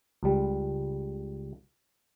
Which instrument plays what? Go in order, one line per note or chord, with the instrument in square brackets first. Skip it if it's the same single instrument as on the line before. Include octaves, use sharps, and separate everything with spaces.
[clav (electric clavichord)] C#2 G3